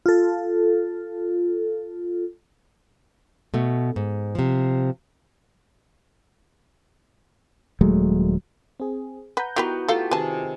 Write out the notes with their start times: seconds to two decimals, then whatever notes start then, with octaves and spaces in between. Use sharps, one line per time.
0.06 F4 A4
3.54 B2 A3
3.96 G#2
4.35 C3 F3
7.81 D#1 F#3 G#3 A3
8.80 C4 G#4
9.37 B4 F#5 A#5 G6
9.56 D#3 G3 B3 E4 F#4 B4
9.88 A3 F4 G4 A4 F5
10.11 C3 D#3 G#4 B4 A5